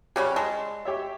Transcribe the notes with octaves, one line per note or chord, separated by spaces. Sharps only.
C#3 G3 C#4 G4 F#6
G#3 A5
G4 C#5 E5